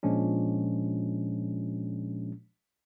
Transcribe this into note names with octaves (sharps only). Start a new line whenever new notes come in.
A#2 F3 G#3 C#4 D4